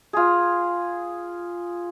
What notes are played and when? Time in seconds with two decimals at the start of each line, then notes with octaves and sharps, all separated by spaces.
0.13 F4 G#4